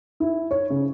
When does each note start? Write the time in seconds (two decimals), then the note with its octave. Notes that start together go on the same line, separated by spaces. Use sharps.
0.20 E4
0.51 C#5
0.70 C#3